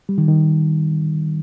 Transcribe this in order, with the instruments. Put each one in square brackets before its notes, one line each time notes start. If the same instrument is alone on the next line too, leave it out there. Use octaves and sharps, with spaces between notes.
[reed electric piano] G3
D#3
D#3